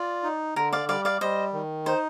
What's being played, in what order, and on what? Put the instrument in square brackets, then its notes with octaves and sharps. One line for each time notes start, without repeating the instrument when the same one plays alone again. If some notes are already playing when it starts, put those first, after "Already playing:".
Already playing: [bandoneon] F4 [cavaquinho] D5
[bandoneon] D#4
[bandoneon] D3 [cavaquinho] A#4
[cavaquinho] D5 F5
[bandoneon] G3 [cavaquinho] D5 F5
[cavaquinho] D5 F5
[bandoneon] G3 [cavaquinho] C5 D#5
[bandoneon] D#3
[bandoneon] D#4 [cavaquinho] C5